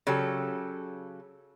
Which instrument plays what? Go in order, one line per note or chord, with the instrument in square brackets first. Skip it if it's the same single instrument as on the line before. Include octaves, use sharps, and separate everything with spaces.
[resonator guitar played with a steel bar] C#3 F#3 G4 A4